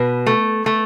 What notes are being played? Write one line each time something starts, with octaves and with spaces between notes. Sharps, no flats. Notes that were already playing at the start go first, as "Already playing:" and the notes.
Already playing: B2 B4
A3
A3